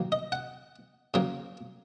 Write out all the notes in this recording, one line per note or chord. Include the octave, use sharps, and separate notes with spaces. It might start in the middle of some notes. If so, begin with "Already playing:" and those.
Already playing: D#3 F#3 A#3
D#5
F#5
C#3 F#3 A#3